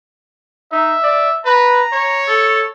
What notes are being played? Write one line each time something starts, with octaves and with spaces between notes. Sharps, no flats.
D#4 E5
D5
B4 A#5
C#5
A4